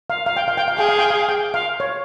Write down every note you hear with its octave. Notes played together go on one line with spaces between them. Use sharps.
F5
F5
G5
F5
G5
F5
G#4 G5
F5
G5
F5
G5
F5
C#5